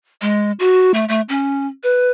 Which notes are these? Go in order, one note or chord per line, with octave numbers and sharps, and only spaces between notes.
G#3
F#4
A3
A3
C#4
B4